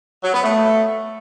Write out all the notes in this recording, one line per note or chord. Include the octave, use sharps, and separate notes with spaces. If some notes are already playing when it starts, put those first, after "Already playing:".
F#3
B3
A3